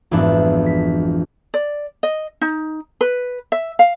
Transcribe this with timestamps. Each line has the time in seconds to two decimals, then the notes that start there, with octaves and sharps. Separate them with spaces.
0.11 G#1 F2 E3 B3 D4
0.66 B6
1.54 D5
2.03 D#5
2.41 D#4
3.01 B4
3.52 E5
3.79 F5